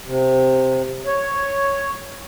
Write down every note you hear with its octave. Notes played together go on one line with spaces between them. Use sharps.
C3
C#5